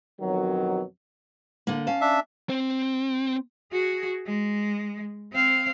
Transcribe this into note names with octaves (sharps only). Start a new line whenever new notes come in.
F2 B2 D#3 F#3
D3 A#3
C#4 F5 A5
D4 E5
C4
F#4 G#4
G#3
C4 F5